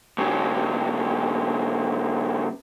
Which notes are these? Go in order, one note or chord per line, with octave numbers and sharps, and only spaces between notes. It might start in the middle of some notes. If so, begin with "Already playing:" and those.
G2 C#3